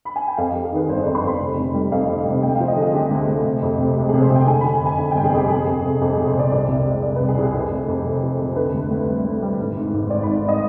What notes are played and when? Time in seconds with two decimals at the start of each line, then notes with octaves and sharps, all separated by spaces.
0.05 B5
0.16 G#5
0.27 G5
0.37 F2 F5
0.51 F2 G4
0.63 G#4
0.72 D#3 B4
0.89 G1 C5
1.02 F2 D5
1.15 C6
1.24 F2 B5
1.40 F1
1.57 F1
1.74 G3
1.92 F2 F5
2.09 F1
2.26 C3
2.43 D2 G5
2.55 F3 F5
2.68 D#5
2.76 D3 G#4
2.94 D3 G4
3.11 D2
3.28 D2
3.45 C3
3.62 F2
3.79 C3
3.96 G#3 G4
4.09 C3 G#4
4.22 C5
4.30 C3 G5
4.47 D3 G#5
4.61 D3 B5
4.82 F2 G#5
4.99 D3 G#5
5.11 G1 G5
5.24 G#4
5.33 F2 G4
5.50 F2 G#4
5.67 F2
5.84 C3
6.01 F2 G#4
6.13 C3 G#4
6.27 C5
6.34 C3 D5
6.51 C2 D5
6.69 C3
6.86 G#3
7.03 C3 D5
7.16 C2 B4
7.29 G#4
7.37 C2 G4
7.54 F2 G#4
7.72 F1
7.88 F2
8.06 C3
8.23 F3
8.40 C3
8.56 D3 B4
8.74 D2
8.91 D2
9.08 G3
9.24 D2
9.42 G3
9.59 G#1
9.77 G#2
9.94 G#1
10.10 G#1 D5
10.23 G#1 B5
10.48 D#5